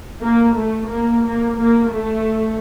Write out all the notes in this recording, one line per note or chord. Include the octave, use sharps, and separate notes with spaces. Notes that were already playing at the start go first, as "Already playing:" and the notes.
A#3
A3
A#3
A#3
A#3
A3